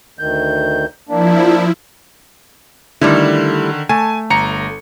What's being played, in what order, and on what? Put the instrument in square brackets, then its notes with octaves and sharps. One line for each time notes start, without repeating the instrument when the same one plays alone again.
[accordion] D2 D#3 G6
[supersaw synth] F3 E4 [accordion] A#3 D4
[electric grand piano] D3 D#3 [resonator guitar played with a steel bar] G3 A3 E4
[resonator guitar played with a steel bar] A3 [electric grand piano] G#5
[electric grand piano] G1 A#5 C#7